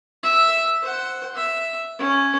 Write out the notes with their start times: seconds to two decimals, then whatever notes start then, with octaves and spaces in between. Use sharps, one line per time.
0.23 E5
0.82 C5 F#5
1.35 E5
1.99 C#4